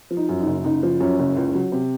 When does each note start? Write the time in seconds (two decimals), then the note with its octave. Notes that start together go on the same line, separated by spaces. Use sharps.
0.11 F3
0.17 D#4
0.29 F#2
0.40 D#4
0.47 F#1
0.64 F#1 D#4
0.83 F3
1.00 F#2 C#4
1.19 F#1
1.37 C#2
1.55 F#3
1.72 C3